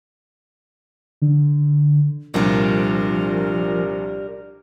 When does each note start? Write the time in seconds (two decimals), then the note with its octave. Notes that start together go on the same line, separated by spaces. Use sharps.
1.22 D3
2.34 C2 A#2 F3 G3 D4 G4 A#4